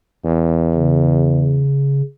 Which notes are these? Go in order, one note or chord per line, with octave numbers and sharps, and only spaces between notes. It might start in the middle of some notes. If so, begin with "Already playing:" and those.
E2
C#3